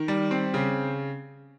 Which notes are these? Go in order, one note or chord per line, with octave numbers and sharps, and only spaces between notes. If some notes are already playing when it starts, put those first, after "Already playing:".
Already playing: D#3
G3
C4
C#3